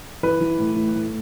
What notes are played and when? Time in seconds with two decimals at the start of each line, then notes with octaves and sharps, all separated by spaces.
0.23 E3 B4
0.41 E3
0.59 A2
0.76 E3
0.94 A2